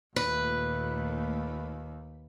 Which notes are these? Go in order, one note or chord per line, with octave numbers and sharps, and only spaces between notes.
D#2 A#2 A3 B4 B5